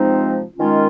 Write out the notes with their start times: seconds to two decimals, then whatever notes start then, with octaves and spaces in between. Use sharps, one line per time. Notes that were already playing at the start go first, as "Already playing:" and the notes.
Already playing: C3 F3 G#3 C4 D#4
0.57 D#3 G#3 C#4 F4